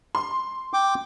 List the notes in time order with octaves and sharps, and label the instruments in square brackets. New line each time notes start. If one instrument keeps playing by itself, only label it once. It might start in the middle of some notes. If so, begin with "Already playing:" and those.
[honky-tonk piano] C6
[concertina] G5 D6